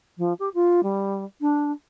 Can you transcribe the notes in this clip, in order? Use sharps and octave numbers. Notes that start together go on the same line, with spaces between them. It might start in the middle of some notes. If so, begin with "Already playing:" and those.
F3
G4
F4
G3
D4